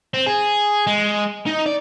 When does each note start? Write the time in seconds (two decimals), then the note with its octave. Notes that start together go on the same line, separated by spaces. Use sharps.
0.14 C4
0.26 G#4
0.87 G#3
1.46 D#4
1.66 D5